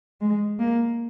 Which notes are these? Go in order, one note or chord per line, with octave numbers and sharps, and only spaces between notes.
G#3
A#3